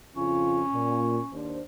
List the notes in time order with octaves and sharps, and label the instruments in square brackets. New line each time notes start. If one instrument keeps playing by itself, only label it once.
[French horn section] F2 C#3 F4 [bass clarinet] C#4
[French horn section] A#2
D#2 D4 C5